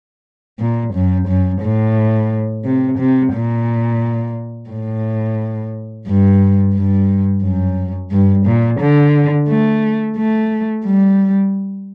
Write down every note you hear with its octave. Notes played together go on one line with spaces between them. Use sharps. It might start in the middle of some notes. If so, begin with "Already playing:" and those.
A#2
F#2
F#2
A2
C3
C3
A#2
A2
G2
G2
F#2
G2
A#2
D3
A3
A3
G3